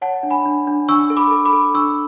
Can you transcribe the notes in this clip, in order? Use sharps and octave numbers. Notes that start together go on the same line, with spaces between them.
C#5 F#5 A5
D4
G#5 B5
D4
D4
D4 C#6 E6
A4
B5 D6
A4
B5 D6
A4
D4 C#6 E6